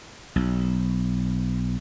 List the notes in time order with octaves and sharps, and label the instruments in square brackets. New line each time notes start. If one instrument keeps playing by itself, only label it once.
[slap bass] B1